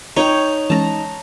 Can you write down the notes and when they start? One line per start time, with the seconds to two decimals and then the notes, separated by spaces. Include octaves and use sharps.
0.17 D#4 C#5 G5
0.70 E3 G#3 C#4 A5 A#5